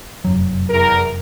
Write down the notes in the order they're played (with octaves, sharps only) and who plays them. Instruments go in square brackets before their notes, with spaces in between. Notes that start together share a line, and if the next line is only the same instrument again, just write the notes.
[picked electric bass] F1 F#2 F#3
[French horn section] E2 A#4